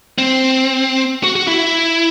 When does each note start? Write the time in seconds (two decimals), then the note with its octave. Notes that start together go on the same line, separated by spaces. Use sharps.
0.18 C4
1.24 F#4
1.36 F#4
1.47 E4